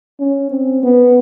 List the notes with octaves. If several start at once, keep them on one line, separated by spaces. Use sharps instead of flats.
C#4
C4
B3